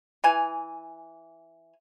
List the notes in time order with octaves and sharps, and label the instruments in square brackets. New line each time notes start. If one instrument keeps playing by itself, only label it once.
[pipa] E3 G#5